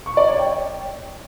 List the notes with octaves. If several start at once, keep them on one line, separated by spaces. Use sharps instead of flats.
C#6
D5
C#5
G5